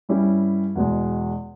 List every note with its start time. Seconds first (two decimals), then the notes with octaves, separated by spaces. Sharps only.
0.09 G2 G3 C#4 E4 G4
0.75 E2 B2 G#3